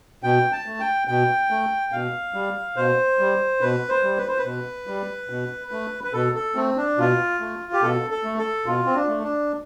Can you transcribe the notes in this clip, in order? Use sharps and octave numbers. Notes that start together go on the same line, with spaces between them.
B2 G5
A5
A3
G5
B2 G5
A3
B2 F5
G3
B2 C5
G3
B2 B4
C5
G3
B4
C5
B4
B2
G3
B2
A3
B4
B2 A4
A4
A3 C4
D4
B2 F4
A3
G4
B2 A4
A4
A3
A4
B2 F4
C4
D4
A3
D4